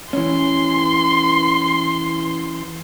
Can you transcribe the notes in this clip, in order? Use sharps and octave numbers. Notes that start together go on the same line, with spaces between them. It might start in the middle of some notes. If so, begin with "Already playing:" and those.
E3 C#4 C6